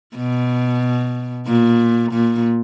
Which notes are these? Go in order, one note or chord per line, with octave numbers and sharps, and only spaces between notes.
B2
A#2
A#2